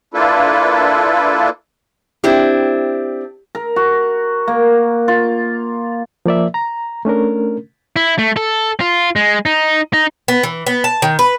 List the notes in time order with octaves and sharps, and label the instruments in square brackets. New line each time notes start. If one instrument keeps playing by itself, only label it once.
[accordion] A#3 D4 E4 F4 A4 B4
[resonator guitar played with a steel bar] C4 D4 E4 [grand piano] G4
[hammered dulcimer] A#4
F#4
A#3
F4
[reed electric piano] F3 A#3 D5 E5
A#5
A3 C#4 D4 A#4
[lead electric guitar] E4
A3
A4
F4
G#3
D#4
D#4
[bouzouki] B3
E3
B3
A5
D#3
B4